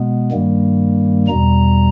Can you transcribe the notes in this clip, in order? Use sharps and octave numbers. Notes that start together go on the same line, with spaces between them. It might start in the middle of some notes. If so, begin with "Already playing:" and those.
Already playing: B2 G#3 B3
G2 D#3 G3 A#3
E2 B2 G3 A#5